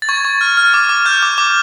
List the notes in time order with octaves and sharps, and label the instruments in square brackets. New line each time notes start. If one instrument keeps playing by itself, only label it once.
[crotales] A6
C#6 G#6
C#6
F6
F6
D6
D6
F6 G6
D6
D6